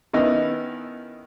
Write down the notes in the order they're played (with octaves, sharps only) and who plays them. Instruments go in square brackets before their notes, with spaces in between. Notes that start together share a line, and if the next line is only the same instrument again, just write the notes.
[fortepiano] D#3 B3 C#4 D#4 E4